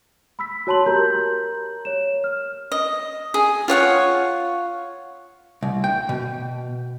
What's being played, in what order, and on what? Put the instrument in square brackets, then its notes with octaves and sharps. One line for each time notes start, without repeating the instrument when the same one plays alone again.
[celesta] B5 E6 B6
F#4 C#5 A5 C6 F#7
G4 A#4 A#5 G6
C#5 E7
F6
[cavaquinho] D#5
G#4
F4 C#5 F#5 C#6
[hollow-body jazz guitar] C2
G5
B2